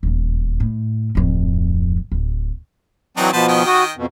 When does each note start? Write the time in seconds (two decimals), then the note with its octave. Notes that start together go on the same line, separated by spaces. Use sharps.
0.03 D#1 E2
0.60 A2
1.15 D1 F2
2.12 D1
3.17 E3 F#3 C4 D4 D#4 F#4
3.33 B2 F3 B3 B4 C5 A5
3.48 D#3 D#5 G5
3.66 F#4 D#6
3.96 F2 B2